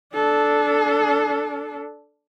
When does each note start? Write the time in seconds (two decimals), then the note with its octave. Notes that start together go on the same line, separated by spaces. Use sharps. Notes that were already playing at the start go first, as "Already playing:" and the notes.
0.15 D4 A4